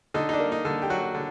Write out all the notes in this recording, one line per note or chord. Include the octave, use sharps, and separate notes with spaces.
D3 D#4
D#4
D4
A#3
D#4
D3
G4
F#3 F#4
D3